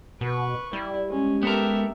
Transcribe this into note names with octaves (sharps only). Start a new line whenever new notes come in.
B2 B4 C#6
G3 E4
G#3 C#4
B3 G4 A4 A#4 E5